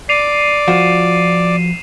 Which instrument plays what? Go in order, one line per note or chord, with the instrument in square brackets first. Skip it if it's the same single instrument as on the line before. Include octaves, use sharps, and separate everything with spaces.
[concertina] D5 [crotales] C7 D#7 F7
[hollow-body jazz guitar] F3 F4 F#4 [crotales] E7